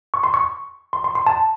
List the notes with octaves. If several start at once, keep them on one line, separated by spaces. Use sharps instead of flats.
C#6
C6
C#6
C6
C6
C6
A5